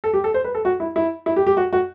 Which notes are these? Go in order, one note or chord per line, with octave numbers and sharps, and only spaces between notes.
A4
G4
A4
C5
B4
A4
F#4
E4
E4
E4
G4
G4
F#4
F#4